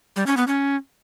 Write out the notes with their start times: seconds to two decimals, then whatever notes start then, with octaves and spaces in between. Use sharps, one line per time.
0.16 G3
0.27 C#4
0.37 B3
0.47 C#4